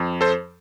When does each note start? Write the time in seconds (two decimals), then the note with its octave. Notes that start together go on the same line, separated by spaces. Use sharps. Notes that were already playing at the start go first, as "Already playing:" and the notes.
Already playing: F2
0.21 A4 C5